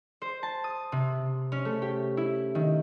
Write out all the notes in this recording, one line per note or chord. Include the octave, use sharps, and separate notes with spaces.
C5
A5
D#6
C3
C#4
A3
G4
E4
D#3